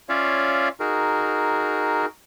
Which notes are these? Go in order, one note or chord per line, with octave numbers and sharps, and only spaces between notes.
C#4 F4 C#5 D5 E5 F5
D#4 F#4 G#4 A#4